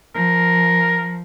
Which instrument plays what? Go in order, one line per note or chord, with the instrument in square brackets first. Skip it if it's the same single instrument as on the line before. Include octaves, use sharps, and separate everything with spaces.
[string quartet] F3 [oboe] A#4